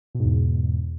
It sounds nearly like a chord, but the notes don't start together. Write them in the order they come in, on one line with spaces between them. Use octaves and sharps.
B2 G#2 E2